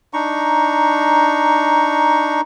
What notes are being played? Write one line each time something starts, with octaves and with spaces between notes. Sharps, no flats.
D4 D#4 A#5 C#6